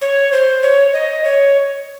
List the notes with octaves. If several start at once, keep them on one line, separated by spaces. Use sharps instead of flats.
C#5
C5
C#5
D#5
C#5